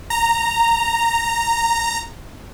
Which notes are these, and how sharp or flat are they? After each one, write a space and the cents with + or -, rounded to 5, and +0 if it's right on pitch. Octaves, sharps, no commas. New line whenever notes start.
A#5 -10